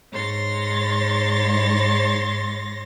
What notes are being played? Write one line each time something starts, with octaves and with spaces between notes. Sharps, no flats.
G#2 C#5 C6 A6 A#6